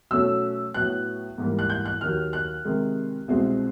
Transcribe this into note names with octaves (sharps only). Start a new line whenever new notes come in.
B2 F#3 A3 C#4 E6
A2 F#3 B3 F#6
G#2 E3 G3 A#3
F#6
G6
F#6
D#2 D#3 F#3 F6
F#6
C3 D#3 G#3
C2 B2 G#3 C4